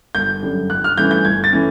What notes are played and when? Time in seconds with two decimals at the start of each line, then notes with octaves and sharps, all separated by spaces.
0.15 G1 G6
0.43 F#2 D3 G3
0.70 G1 F#6
0.84 F6
0.98 G2 E3 A3 C#4 G6
1.11 G6
1.25 G1 G#6
1.44 A6
1.53 E3 A3 C#4